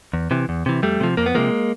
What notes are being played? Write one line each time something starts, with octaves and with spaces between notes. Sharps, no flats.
E2
C3 E3
E2
C3 E3
F2 G3 A3
C3 F3
F2 A#3
B3
C3 F3 G#3 A#3